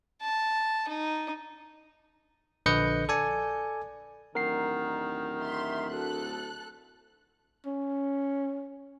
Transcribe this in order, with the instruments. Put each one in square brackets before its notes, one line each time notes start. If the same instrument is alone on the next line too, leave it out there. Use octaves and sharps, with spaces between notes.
[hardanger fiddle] A5
D#4
[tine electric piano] A#1 D3 B4 D#5 G6 C#7
A4 D5 G#5
[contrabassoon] D1 [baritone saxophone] D#3 [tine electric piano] A#4 F#5 C7
[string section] E5 C6
[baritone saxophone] D2 [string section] A4 F#6
[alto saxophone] C#4